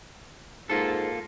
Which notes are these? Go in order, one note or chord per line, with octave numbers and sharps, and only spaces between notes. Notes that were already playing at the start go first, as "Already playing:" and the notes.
G#2 A#3 F4 A4